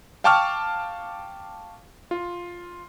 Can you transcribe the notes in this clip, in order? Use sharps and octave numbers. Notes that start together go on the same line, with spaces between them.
F5 G5 A5 C#6 D6 F6
F4